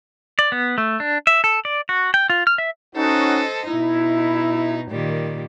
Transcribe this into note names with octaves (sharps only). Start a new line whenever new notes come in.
D5
B3
A3
D4
E5
A4
D5
F#4
G5
F4
F6
E5
C#4 D#4 F#4 A4 C5 D#5
B2 D#4 E4
A#2 D#3 G3